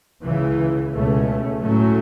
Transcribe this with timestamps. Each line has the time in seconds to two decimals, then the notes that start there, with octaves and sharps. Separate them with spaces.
0.24 C#2 C#3 E3
0.93 C#2 B2 A3 C#4
1.61 A2 F#3 A3 C#4